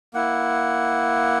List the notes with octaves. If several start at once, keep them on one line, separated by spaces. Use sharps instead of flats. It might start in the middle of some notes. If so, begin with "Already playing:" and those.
A#3 E4 F#5